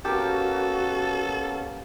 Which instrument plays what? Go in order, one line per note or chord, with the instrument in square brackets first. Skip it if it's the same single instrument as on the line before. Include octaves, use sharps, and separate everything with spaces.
[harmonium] A#3 B3 C#4 [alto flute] F#4 [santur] G4 A#4 [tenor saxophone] A4